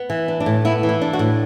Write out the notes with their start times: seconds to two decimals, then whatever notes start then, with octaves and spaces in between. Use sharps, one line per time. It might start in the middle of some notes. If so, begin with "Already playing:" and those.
Already playing: B3
0.10 E3
0.28 D4
0.40 D4
0.46 A2
0.65 B3 E4
0.83 E3
0.89 E4
1.02 D4
1.13 F#4
1.19 A2